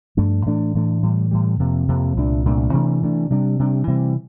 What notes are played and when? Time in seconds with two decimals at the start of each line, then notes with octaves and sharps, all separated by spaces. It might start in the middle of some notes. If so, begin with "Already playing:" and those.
0.17 G2 F3 A3 D4
0.46 A2 E3 A3 D4
0.74 A2 E3 A3 D4
1.03 A2 E3 G3
1.31 A2 E3 G3
1.60 F2 C3 F3 A#3
1.88 F2 C3 F3 A#3
2.17 C2 A#2 A3 D4
2.45 C2 A#2 A3 D4
2.73 C3 E3 A3 D4
3.02 C3 E3 A3 D4
3.30 C3 G3 D4
3.59 C3 G3 D4
3.87 C3 E3 G3 C4